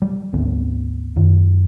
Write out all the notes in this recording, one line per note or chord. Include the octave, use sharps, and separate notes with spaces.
G3
G#1 D2 B3 C4
F#2 D#3